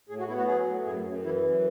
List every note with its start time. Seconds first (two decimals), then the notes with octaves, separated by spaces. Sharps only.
0.09 A2 G#4
0.19 F#4
0.28 B3 E4
0.37 F#4
0.47 F#3 G#4
0.66 A2
0.85 F#2 G#4
1.05 F#2
1.24 E3 E4
1.42 F#2